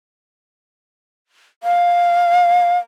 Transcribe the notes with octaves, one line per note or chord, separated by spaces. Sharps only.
F5